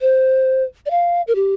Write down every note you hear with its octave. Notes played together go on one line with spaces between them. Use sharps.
C5
D5
F5
A#4
G4